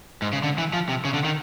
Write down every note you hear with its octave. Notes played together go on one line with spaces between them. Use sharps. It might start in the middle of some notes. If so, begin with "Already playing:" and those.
G#2
C#3
D3
E3
F3
C3
C#3
D3
D#3